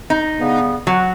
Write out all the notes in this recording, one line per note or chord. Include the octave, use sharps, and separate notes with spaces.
D#4
G2 C#3 B3
F#3 F#5